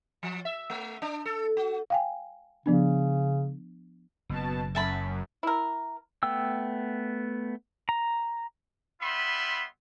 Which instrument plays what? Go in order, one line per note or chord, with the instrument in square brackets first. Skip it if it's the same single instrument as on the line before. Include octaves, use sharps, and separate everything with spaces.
[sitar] F3
E5
A3
D4
A4
F#4
[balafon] F5 G5 G#5
[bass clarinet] C#3 [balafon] F3 B3 D4
[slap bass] F#1 [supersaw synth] B2 A5
[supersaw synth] F#2 [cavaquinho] E5 A5 B5
[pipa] E4 A#4
[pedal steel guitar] A3 B3 G5 E6
A#5
[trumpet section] G3 B3 F4 E5 B5 C6